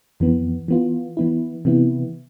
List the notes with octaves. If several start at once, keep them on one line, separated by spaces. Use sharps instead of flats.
F2 E3 B3
E3 B3 F4
E3 B3 E4
C3 E3 B3 E4